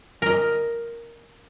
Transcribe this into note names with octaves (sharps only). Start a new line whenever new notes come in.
A#4 D#5